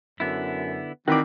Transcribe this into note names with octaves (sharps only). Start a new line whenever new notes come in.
F#2 D3 B3 E4
D#3 E3 C4 F#4 B4 D5 D6